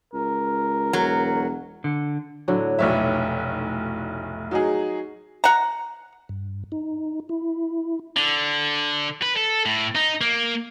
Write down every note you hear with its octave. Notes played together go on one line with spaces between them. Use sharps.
C#2 A#4
E1 F#3
D3
A2 D3 F#3
F1 B1 E4 C#5 D5 E5
F#3 D#4 G#4
F#5 A#5
G2
D#4
E4
D3
B4
A4
A2
D#4
A#3